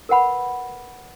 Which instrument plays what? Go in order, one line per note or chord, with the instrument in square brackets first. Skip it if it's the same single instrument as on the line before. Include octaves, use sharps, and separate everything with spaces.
[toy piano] A#4 B4 F#5 B5